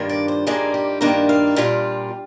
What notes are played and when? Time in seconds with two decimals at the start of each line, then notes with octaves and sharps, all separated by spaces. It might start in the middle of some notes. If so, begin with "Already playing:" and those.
Already playing: G2 D#3 A#3 D4 F4
0.09 D5
0.28 C5
0.46 G2 D#3 A#3 D4 F4 G#4
0.74 G4
1.01 G2 D#3 A#3 D4 F4 A#4
1.29 F5
1.56 A#2 G3 D4 F4